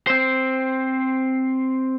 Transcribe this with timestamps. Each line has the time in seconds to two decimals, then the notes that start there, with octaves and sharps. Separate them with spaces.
0.07 C4 C5